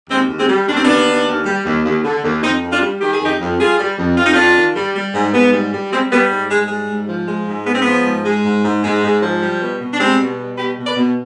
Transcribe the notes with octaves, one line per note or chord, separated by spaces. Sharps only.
D#2 G#3 C4
D#2
G#3 C4
G3
D#2 D4
C4
D#2 B3 D4
D#2
D#2
G3
D#2
D#2
D3
D#2
F2 C4 D#4
F2
D4 F4
G3
D#3 G4
G#4
F2 D#4 G4
F2
G3 F4 G#4
G3
F2
F2 F4
D#4
F2 D4 F4
D#3
G3
G3
G#2
G#2 B3
G3
G3
G3 G#3 C4
G3 B3
G#2
G#2 G#3
G3 G#3
G#2
F3
G#3
G#2
G#3 B3
C4
F3 B3
G#2
G#3
G#2
G#2
G#2 G#3
G#2
F3
G3
B2
B2
D4
G3 G#3 C4
B2
G3
B2 G4 B4
B2
B4 D5
B2